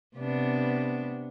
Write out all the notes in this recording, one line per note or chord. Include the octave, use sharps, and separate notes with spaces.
C3 B3 D4